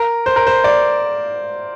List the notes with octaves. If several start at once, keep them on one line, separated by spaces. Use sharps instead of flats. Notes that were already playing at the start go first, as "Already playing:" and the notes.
Already playing: A#4
C5
A#4
C5
D5